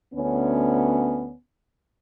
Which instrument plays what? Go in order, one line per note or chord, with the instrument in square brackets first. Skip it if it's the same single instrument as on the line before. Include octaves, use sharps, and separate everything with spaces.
[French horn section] D2 B3 C#4